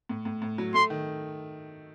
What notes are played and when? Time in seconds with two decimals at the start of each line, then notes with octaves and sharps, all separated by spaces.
0.09 A2
0.25 A2
0.42 A2
0.58 F#3
0.74 A3 C6
0.90 D#3